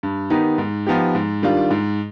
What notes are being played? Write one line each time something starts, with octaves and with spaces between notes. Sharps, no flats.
G2
D#3 B3 D#4 G4
G#2
F3 B3 D#4 G4
G#2
D#3 G3 D4 F4
G#2